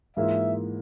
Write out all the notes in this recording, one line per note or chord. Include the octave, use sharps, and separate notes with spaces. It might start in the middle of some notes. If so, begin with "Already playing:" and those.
G#2 E3 A#3 F4 G#4 E5